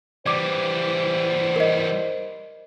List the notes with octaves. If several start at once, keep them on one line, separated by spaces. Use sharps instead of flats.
E3 G3 C5 D5 D6
A#4 D#5